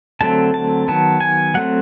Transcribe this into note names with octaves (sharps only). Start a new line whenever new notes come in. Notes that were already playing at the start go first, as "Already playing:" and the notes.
D3 F#3 A3 C4 A5
A5
D#3 F#3 B3 A5
G#5
F#3 A3 C4 F#5